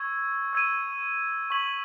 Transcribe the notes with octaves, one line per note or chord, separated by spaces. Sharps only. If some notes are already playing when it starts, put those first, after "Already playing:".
Already playing: C#6 E6 G#6
E6 G#6 D#7
C#6 G#6 B6 F#7